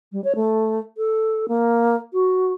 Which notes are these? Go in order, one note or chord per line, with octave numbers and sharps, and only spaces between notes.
G3
C#5
A3
A4
A#3
F#4